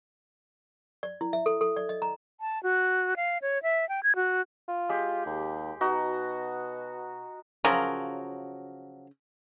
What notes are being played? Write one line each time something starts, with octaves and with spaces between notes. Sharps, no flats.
D5
E4
E5
A4
A4
D5
D#5
A#5
A5
F#4
F5
C#5
E5
G5
G#6
F#4
F4
G#3 G4
D#2
B2 D#4 F#4
C#3 F3 F#3 A#4